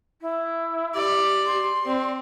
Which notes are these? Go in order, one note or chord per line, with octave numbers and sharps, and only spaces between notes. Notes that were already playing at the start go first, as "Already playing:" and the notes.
E4
G4 D5
C6
C4 D5